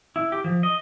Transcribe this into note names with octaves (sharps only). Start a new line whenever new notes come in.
E4
G4
F3
D#5